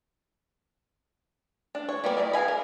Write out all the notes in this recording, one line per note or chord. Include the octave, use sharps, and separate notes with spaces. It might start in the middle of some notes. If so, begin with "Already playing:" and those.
D4
C#5
G3 B3 A#4 C#5 D5
E4 G#4 A#4 D5 D#5
E3 G#4 F5 G#5 B5
A#4